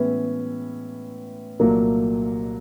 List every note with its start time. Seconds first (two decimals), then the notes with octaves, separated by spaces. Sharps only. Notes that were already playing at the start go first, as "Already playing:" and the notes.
Already playing: A2 E3 G#3 B3 C#4 E4
1.59 C2 A#2 F#3 A3 A#3